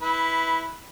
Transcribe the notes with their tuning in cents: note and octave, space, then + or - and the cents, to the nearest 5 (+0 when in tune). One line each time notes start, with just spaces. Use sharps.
E4 -15 B4 +0